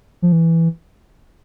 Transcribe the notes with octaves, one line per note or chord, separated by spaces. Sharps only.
F3
E3